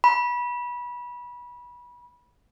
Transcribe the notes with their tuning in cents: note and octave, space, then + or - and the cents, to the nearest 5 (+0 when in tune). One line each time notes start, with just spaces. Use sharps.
B5 -25